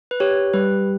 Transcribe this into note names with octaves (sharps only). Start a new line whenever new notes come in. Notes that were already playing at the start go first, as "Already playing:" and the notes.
B4
G4 C#5
G3 B4